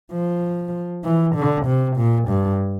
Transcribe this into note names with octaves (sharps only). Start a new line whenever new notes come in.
F3
E3
D3
C3
A#2
G2